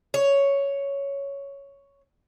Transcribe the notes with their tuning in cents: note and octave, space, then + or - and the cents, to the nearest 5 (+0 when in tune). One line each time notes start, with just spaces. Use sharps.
C#5 +5